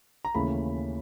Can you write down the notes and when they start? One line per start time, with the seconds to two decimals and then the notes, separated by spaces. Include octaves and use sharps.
0.25 A#5
0.35 D#2 C#3 E3 A3 C#4 B5